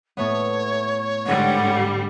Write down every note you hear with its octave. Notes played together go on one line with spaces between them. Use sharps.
A2 A3 B3 C#5
G#2 D3 G3 F#5